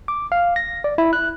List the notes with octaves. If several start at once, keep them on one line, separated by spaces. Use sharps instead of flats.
D6
F5
A#6
D5
E4
F#6